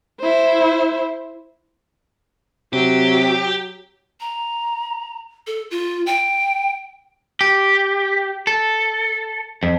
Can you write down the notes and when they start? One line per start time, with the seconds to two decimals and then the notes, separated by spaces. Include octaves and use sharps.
0.20 E4 C5
2.73 C3 F#3 G4
4.20 A#5
5.47 A4
5.71 F4
6.06 G5
7.41 G4
8.47 A4
9.63 F2